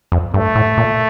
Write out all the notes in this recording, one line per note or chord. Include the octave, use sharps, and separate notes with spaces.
F2
G2 A3
A2
A#2